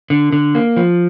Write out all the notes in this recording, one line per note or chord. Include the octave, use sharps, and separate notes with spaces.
D3
D3
A#3
F3